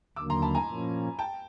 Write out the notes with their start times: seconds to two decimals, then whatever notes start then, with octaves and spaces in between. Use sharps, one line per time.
0.16 D#2 D3 F#3 A#3 D6 E6
0.30 A#5 C6
0.42 A5 B5
0.55 G#5 A#5
0.68 A#2 F3 A#3 C#4
1.19 G5 A5